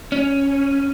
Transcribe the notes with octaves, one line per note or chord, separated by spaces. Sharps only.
C#4